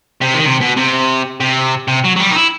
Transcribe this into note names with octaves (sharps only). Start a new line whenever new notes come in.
C3
D#3
C3
B2
C3
C3
C3
F#3
F#3
G3
D#4
E4